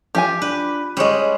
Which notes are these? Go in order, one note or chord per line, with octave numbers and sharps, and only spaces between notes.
F3 F4 G4 G#5
D4 B4
G3 G#3 C#4 C#5 D#5